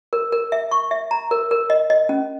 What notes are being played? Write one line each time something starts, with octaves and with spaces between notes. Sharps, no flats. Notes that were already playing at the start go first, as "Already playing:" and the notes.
A#4
A#4
E5
C#6
E5
A#5
A#4
A#4
D#5
D#5
C#4